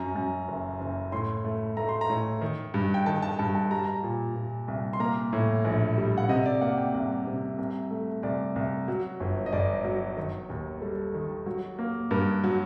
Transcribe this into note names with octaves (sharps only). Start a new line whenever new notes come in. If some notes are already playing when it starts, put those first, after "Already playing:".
Already playing: F#2 A#5
F#2
F#1
F#1
A2 C6
A3
A3 A#5
C6
A#5
A2
D#3
G2
G5
D#3 A5
A5
G2 A5
A5
G3 A#5
A5
A#5
A#2
A#2
C2
C6
A#3 A#5
A2
A#1
G3
F#5
C3 D#5
D5
A#3 F#5
G5
C2 F#5
C3
C2
A3
C2 D5
C2
F#3
G1
D#5
G1 D5
F#3
D#3
D#2
G3 A4
D#3
F#3
A#3
G2 A#4
F#3